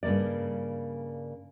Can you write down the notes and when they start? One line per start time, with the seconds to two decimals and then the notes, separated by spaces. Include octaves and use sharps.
0.03 G2 C#3 A3 A#3 D5